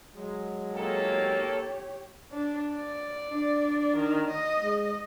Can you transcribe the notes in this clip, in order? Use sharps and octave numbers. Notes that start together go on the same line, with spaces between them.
F#3 G#3
A#3 G4 A4 C#5
D4
D5
D4
D#3
D#5
G#3